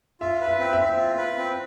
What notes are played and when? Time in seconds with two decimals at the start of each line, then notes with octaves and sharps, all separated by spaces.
0.21 F4 E5
0.41 B4
0.46 E5
0.60 C4
0.73 E5
0.79 C4
0.98 F4
1.17 B4
1.37 C4